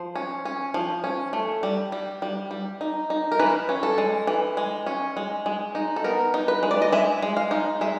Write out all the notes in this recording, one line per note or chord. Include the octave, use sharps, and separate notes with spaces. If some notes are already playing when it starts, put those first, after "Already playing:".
Already playing: F3 C5
C#4
C#4
F3
C#4
A3
G3
G3
G3
G3
D#4
D#4
A#4
E3 B4
C#4
A4
G#3
E3
G#3
C#4
G#3
G#3
D#4
A4
B3 A#4
D#4
B4
G#3
D5
D#5
G#3 E5
G#3
F5
D#4
G#3 E5